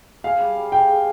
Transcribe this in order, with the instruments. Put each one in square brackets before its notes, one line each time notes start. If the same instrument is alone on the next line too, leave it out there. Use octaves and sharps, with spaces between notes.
[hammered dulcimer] G#4 [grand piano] F5
[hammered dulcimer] G3
G3
[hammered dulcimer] G#4 [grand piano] G5
[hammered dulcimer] G#4